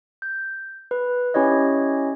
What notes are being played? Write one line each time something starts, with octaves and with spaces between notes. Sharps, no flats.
G6
B4
C#4 E4 G4 C#5 D#5